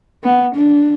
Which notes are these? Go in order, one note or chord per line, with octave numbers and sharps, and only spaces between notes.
B3
D4